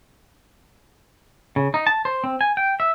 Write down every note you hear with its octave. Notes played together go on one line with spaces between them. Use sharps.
C#3
D#4
A5
C5
C4
G#5
G5
E5